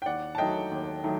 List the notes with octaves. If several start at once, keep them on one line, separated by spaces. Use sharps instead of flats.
G5
D#2 D5 F#5
A5
D#3 F#3 A3 D#5 G5
D#2
D#3 F#3 A3